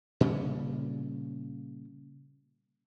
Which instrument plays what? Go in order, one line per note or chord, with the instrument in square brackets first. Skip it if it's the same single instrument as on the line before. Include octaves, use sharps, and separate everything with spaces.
[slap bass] A#2 C#3 G3 C#4